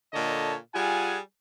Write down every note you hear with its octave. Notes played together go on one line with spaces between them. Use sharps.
A#2 D3 A4 C#5 D#5 A5
G3 F4 G#4 F#5 G#5